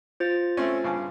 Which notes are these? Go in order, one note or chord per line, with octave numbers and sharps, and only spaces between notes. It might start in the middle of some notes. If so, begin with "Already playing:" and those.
F4 C5 A6
A3 C4 C#4
G2 C#3 A5